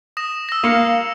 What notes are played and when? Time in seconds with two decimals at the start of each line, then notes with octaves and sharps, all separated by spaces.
0.17 D#6 A#6 E7
0.49 E6 A#6
0.64 A#3 F5 C#7 F7